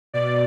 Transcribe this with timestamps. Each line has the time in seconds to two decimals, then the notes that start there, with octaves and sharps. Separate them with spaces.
0.14 B2 D5